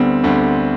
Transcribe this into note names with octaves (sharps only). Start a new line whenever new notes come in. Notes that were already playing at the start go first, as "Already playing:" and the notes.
Already playing: D2 D3 G3 B3 C4
D2 D3 G3 C4